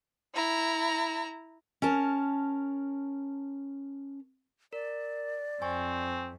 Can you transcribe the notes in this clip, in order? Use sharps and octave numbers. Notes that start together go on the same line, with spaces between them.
E4 A#5
C#4 A#4 A5
A#4 D5
F2 C4 G#5 C#6